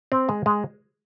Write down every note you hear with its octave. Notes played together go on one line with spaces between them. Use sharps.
C4
G#3
G#3